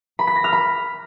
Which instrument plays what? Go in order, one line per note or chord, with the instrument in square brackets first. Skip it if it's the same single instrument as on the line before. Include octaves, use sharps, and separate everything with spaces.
[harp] B5
B6
A#6
F6
B5